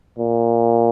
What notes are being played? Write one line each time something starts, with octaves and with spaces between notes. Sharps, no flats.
A#2